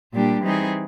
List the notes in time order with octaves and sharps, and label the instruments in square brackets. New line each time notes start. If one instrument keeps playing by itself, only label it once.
[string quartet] A#2 G3 A#3 D4 G4
E3 G3 C4 D#4 G#4